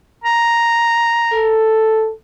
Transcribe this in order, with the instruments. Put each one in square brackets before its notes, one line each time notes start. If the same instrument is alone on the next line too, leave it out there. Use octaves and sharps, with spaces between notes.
[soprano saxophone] A#5
[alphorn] A4